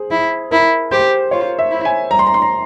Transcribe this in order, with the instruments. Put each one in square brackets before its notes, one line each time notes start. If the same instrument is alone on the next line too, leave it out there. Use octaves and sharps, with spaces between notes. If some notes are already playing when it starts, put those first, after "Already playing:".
Already playing: [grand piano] G#4 C5
[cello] E4
[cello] E4 [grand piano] A#4
[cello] G4 [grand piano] C5
[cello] F4 [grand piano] C#5
[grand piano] E5
[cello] E4
[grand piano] G#5
[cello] G3 [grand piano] A#5
[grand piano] C6
A#5
C6
A#5